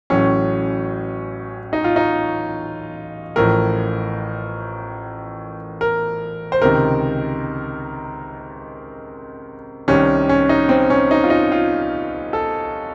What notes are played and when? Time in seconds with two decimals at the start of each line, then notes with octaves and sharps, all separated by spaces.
0.10 A1 A2 F#3 C#4
1.73 D#4
1.84 F4
1.96 D#4
3.36 A1 A2 F3 A#4
5.81 A#4
6.52 C5
6.62 C#2 C3 D#3 A#4
9.88 C2 C3 D#3 C#4
10.29 C#4
10.49 D#4
10.69 C4
10.90 C#4
11.11 D#4
11.24 F4
11.30 D#4
11.52 F4
12.33 A4